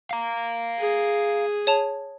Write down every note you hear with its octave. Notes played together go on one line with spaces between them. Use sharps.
F5 A#5
G#4
C#5 A5 F7